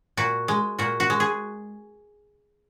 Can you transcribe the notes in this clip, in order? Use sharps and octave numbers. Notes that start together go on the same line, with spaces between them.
A#2 F#4
G#3
A#2 F#4
F#4
G#3
G#4